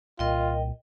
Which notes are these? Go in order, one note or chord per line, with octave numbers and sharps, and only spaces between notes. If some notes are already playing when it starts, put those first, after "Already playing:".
C2 A#2 F4 A#4 D#5 G5